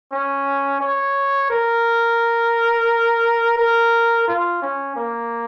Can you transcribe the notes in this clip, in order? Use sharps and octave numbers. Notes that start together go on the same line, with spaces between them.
C#4
C#5
A#4
A#4
F4
C#4
A#3